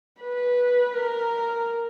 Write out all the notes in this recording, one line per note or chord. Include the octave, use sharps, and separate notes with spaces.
B4
A#4